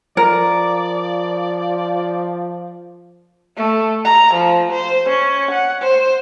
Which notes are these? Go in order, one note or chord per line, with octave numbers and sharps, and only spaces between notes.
F3 A#4 D5
A3
A#5
F3
C5
C#4
F#5
C5